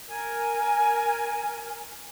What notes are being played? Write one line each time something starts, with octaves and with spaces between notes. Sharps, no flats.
A#4 G#5